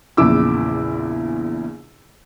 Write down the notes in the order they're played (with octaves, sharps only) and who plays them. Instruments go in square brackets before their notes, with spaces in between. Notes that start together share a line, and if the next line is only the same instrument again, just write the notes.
[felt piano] A#1 E2 C#3 E4 D6 E6